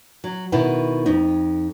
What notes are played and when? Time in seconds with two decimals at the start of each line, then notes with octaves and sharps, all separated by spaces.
0.24 F#3
0.52 B2 D#3 B3 E4
1.06 F2 D#4